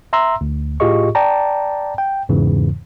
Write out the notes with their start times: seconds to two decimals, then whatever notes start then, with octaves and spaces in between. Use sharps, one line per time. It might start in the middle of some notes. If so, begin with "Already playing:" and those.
0.13 E5 A#5 C6 E6
0.41 D2
0.80 A2 F4 G4 G#4 D#5 C#6
1.15 D5 G5 A5 A#5
1.98 G5
2.29 E2 G#2 C#3 E3